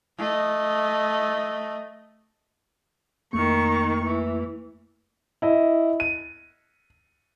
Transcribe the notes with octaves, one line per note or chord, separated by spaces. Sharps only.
A3 D#5
F2 D#3 A3 A#3 C#6
E3
E4 D#5
D#7